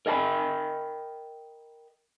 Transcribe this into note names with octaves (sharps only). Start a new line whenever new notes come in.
A#4 D#5 G5 A5 B5